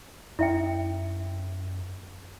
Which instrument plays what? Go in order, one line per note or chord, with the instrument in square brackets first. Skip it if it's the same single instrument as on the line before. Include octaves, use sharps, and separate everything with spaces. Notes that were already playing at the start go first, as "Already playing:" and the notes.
[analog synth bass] F#2 [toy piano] E4 E5 G5